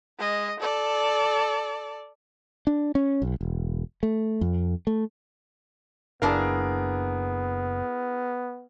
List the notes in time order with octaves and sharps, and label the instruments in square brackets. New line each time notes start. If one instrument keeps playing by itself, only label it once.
[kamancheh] G#3 D#5
A4 D5
[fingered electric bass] D4
C#4
B1
E1
A3
F2
A3
[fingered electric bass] F#1 [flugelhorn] B3 [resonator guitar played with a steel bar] D4 E4 F5 [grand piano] G#4 A#4